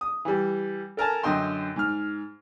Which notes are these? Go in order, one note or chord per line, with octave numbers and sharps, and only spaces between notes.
D#6
E3 G3
A4 A#4 G#5 A5
F#2 D3 D#5 G5 C6
G#2 F6